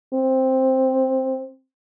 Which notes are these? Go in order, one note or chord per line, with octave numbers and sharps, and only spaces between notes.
C4